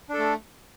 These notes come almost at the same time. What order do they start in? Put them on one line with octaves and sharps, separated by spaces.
D4 A4 A3